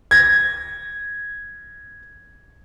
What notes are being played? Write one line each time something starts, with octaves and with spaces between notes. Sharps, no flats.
G#6 A#6